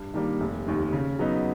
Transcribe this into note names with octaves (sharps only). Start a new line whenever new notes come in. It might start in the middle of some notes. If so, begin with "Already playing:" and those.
Already playing: G2
D#3 G3 A#3
F1
D#2 D#3
C#3
F#3 B3 D#4